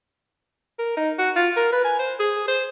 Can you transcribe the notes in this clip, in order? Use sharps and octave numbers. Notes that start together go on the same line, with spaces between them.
A#4
D#4
F#4
F4
A#4
B4
G#5
C5
G#4
C5